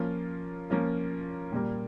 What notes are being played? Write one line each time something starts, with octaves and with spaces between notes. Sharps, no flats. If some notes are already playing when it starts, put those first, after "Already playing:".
Already playing: F3 A#3 C#4 F4
F3 A#3 C#4 F4
A#2 G3 A#3